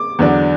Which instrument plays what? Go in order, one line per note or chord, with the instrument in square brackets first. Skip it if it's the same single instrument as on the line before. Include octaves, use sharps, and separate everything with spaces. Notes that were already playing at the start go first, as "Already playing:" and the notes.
Already playing: [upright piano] D6
E2 D3 F#3 B3 D4